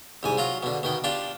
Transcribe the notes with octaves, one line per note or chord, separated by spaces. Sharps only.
C2 G#2 G#5
F#3 F4 A#5
B2 D3
B2 D#3 G5
D4 F4 G4 D5